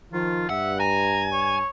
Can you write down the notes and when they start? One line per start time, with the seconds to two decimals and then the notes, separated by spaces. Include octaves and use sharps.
0.13 D#3 F3 F4
0.49 G2 E5 F#5
0.80 G#5 A#5
1.33 C#5